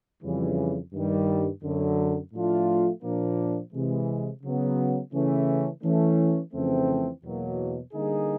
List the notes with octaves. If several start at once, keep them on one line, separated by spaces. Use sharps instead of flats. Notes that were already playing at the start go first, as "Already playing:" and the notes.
F2 C#3 E3 G3
G2 D#3 G3
F#2 D3 F#3
A2 F3 A3 D4 F4
A#2 F3 A#3 D4
C3 E3 G#3
C#3 F#3 B3
C#3 E3 A3 C#4
E3 A3 C#4
F2 C#3 E3 A3 C4
E2 B2 F#3 A#3
D3 G3 A#3 D#4 G#4